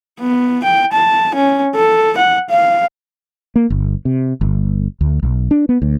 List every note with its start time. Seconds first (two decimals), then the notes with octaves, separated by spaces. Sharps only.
0.20 B3
0.64 G5
0.93 A5
1.35 C#4
1.75 A4
2.18 F#5
2.50 F5
3.56 A#3
3.70 G1
4.05 C3
4.41 G1
5.01 D2
5.23 B1
5.51 D4
5.69 B3
5.82 D2